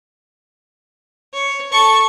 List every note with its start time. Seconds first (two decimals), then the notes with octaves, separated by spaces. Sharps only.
1.33 C#5
1.72 A4 C#6